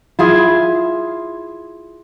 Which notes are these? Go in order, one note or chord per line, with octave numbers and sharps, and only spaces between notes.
E4 F4 G#4